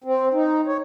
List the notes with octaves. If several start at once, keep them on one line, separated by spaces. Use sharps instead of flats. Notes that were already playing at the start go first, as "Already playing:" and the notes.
C4
D#4
C#5